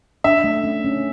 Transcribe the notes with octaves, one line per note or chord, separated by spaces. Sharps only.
D4 E5
A3
C#4
C#4